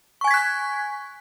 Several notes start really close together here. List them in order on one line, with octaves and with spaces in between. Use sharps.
C#6 G#5 G#6 B6 F#6